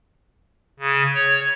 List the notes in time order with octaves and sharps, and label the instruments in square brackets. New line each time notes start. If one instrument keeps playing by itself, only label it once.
[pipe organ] C#3
C#5